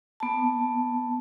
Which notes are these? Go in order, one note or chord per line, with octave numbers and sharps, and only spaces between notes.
B3 A5